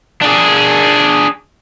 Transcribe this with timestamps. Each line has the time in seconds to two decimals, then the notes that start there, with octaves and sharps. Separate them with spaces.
0.22 D4 G#4